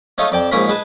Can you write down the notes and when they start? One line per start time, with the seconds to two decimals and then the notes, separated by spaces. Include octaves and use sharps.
0.18 A3 C#4 D#4 F4 A4
0.32 F2 D5 G5 A5
0.51 A#1 G#2 A#3 C#4 A#4 B5
0.68 G#3 B4 A5